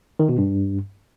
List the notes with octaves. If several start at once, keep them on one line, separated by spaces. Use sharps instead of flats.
D#3
B2
G2